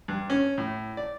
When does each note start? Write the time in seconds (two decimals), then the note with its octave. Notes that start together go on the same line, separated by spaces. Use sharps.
0.08 G2
0.30 C#4
0.58 A2
0.97 D5